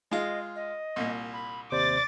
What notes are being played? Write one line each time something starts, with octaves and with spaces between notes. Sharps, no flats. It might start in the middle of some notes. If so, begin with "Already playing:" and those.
G#3 F4 D#5
D#5
C2 A#2
B5
D#2 C3 C5 D5 D6 A6